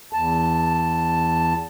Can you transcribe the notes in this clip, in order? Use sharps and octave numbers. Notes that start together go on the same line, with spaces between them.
E2 A5